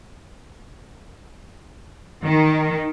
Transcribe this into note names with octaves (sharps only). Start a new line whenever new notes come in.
D#3